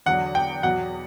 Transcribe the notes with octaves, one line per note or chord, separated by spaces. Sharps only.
E2 D3 F#3 F#5
G5
E2 B2 F#3 F#5